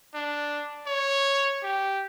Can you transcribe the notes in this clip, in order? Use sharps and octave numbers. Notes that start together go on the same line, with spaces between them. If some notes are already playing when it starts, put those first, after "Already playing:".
D4
C#5
G4